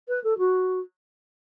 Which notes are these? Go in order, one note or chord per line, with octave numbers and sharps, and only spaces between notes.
B4
A4
F#4